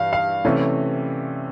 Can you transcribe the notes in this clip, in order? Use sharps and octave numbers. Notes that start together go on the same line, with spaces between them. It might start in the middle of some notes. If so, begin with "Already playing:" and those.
Already playing: G2 E3 F5
F5
C3 E3 A3 C#4